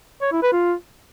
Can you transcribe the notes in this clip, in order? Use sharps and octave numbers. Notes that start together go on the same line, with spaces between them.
C#5
E4
B4
F4